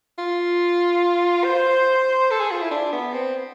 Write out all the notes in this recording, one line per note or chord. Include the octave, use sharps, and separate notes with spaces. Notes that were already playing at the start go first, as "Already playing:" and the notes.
F4
C5
A4
G#4
F4
E4
D4
B3
C4